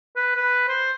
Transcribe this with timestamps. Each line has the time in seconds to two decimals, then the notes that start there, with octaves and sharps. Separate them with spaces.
0.16 B4
0.36 B4
0.69 C5